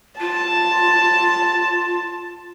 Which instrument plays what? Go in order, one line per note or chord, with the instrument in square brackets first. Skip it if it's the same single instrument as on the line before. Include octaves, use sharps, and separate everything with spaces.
[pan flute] F4 [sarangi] A5